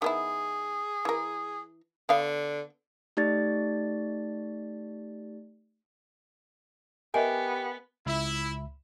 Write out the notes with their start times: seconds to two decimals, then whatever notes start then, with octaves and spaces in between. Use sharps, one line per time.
0.02 D#3 B3 E4 G#4
1.05 E3 A#4
2.09 D3 B3 F5
3.17 A3 D#4 G4 D5 A6
7.14 B3 G4 A#4 D#5 E5 G#5
8.06 C#2 E4 E5 B5